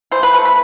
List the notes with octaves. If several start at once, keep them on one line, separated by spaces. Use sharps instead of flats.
E3 C5
B4
A3
B4